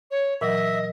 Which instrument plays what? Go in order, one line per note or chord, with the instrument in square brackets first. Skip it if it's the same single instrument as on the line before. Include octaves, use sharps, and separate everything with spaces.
[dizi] C#5
[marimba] A#2 E3 F#3 [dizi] D#5 [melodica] E5